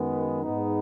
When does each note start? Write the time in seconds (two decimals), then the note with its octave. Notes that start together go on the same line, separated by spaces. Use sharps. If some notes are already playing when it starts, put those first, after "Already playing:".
Already playing: F#2 D#3 G#3 B3
0.43 G#2 G#3 B3 D#4